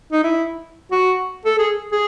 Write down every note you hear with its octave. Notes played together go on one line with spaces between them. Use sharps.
D#4
E4
F#4
A4
G#4
G#4